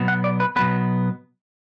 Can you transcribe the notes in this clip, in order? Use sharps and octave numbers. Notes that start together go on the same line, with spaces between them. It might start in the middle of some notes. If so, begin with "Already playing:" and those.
Already playing: B2 F#3 B3
F#5
D5
B4
B2 F#3 B3 B4